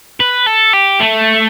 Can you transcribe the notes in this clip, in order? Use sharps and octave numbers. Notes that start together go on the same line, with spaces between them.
B4
A4
G4
A3